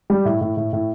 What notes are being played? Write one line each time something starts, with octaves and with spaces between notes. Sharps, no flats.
G3
A2
A2
A2
A2